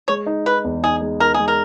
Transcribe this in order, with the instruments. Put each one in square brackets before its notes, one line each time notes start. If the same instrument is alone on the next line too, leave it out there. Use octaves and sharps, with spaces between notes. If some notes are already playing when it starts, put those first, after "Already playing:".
[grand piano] G#3 [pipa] C#5
[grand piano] D#4
[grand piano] D#4 [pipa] B4
[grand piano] E2
[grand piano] D#4 [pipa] G#4
[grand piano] G#3
[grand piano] D#4 [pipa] A#4
[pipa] G#4
[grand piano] G#3
[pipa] A#4